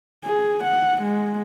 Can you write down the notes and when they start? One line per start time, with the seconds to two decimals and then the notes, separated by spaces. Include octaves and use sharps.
0.25 G#4
0.64 F#5
1.02 G#3